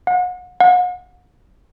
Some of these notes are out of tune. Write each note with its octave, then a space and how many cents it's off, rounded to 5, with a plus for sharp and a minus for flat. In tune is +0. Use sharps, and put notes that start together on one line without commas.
F#5 -35
F#5 -40